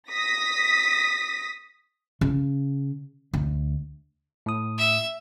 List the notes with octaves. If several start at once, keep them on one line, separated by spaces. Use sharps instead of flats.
D#6 A#6 B6
C#3
D2
A2 D#6
E5